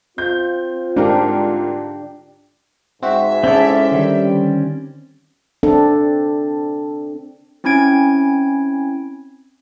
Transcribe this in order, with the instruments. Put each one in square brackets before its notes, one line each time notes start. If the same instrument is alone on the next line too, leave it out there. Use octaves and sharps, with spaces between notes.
[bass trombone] C4 [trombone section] F4 [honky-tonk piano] G6
[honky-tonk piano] G#2 A#4 [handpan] D4 G4
[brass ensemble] G#2 [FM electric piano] C4 F#4 [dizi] E5
[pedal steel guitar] C4 C#4 D5 [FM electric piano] E4 G#4 A4
[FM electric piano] D3 D#3 [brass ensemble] G3
[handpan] C4 D4 A4
[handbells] C4 C#4 E4 G#5 G#6 D7